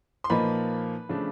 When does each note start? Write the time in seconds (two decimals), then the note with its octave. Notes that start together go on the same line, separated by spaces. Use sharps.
0.24 C6
0.30 A#2 F3 A#3 D#4 B4 B5
1.09 C#3 F3 A3 D4